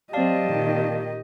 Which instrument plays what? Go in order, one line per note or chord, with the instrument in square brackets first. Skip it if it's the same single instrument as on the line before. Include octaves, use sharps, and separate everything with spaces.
[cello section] F#3 C4 [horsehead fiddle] G4 D#5 [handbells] D5 F5 A5
[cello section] A#2 D#3